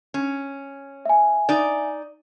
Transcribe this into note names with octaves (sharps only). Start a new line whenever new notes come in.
C#4
E5 G#5
D#4 D5